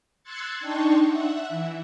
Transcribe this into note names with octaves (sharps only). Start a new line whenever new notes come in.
C6 E6 F#6 G#6 A6 C#7
D4 D#4 G5 A5 C6 C#6
E5 F#5
E3